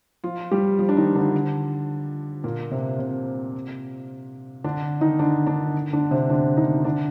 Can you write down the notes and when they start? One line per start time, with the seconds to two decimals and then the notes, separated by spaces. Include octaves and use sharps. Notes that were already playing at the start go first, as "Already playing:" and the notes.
0.24 F3 F4
0.51 G3 G4
0.79 F3 F4
0.89 D4
0.97 D#3 D#4
1.15 D3 D4
2.44 A#2 A#3
2.71 C3 C4
2.99 C3 C4
4.64 D3 D4
5.01 D#3 D#4
5.19 D3 D4
5.47 D3 D4
5.93 D3 D4
6.11 C3 C4
6.30 D3 D4
6.57 D#3 D#4
6.84 D3 D4